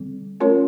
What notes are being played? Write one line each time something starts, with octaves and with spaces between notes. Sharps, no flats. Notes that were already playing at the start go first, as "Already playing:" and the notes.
Already playing: D3 G3 C4
A3 C#4 F4 A#4 C#5